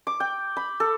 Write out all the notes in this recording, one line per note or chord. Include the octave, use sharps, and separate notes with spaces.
D6
G5
B5
A4